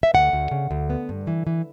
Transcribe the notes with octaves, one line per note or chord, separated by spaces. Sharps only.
E5
D2 F#5
D2
C#3
D2
B3
G2
E3
E3